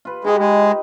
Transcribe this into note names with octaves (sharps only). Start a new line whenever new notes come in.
F4 B4
G#3 D#4 G4 B4
G#3